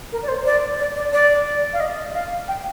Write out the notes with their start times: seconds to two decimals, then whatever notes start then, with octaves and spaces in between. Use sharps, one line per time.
0.12 A#4
0.23 D5
0.28 C5
0.46 D5
0.80 D5
0.96 D5
1.13 D5
1.73 F5
1.80 D#5
2.14 F5
2.48 G5